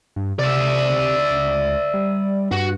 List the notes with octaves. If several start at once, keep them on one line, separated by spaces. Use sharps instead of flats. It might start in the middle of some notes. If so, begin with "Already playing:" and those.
G2
C3 D5 E5
C#2
G3
G2 F#4